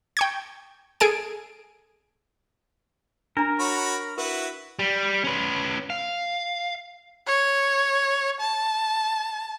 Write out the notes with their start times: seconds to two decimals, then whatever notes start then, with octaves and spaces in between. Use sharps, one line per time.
0.17 G5 C#6 G#6
1.00 G#4 A4 G#5 D7
3.37 D4 A#4 A#5
3.59 F#4 C#5 B5
4.18 E4 F#4 A#4 B4
4.79 G3
5.24 C#4 B4
5.90 F5
7.27 C#5
8.40 A5